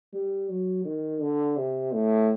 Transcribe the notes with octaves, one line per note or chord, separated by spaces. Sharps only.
G3
F#3
D#3
D3
C3
A2